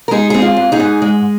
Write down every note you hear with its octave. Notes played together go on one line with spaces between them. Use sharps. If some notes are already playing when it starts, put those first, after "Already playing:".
A#4
G#3 D#4 G#4
C4 G#4
F4
G#2
D#4 G#4
G#2
G#3